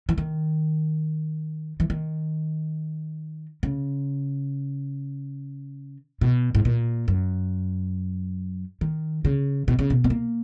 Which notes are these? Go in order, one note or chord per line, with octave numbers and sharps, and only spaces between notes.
E3
D#3
E3
D#3
C#3
B2
G#2
A#2
F#2
D#3
C#3
B2
C#3
B2
B3
A#3